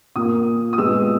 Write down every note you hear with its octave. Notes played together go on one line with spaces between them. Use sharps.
A#2 A#3 D#6
D#6
A#2 G#3 B3 E6